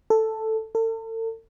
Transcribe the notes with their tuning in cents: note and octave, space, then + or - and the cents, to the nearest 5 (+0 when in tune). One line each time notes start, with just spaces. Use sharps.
A4 +5
A4 +40